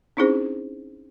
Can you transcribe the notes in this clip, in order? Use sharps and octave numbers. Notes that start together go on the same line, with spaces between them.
C4 C#4 D#4 E4 G#4 C5